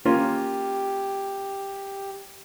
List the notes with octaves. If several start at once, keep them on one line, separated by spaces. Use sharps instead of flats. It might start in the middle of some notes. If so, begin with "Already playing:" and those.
A#3 C#4 F4 G4